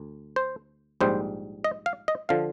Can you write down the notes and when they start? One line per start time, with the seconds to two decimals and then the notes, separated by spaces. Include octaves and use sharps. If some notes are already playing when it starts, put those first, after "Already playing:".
Already playing: D2
0.36 C5
1.01 A#1 G#2 G3 C5
1.64 D#5
1.86 F5
2.08 D#5
2.29 D3 F3 F5